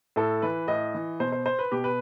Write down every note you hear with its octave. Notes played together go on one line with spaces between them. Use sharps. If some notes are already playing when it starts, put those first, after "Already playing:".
A2 A4
E3 B4
A2 D#5
E3
B2 C5
C5
C5
B4
B2 G4
B4